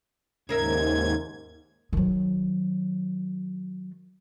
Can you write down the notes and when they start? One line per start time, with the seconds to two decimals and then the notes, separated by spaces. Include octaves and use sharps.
0.49 D#2 G#2 C#3 A#4 E5 G#6
1.93 D#3 F#3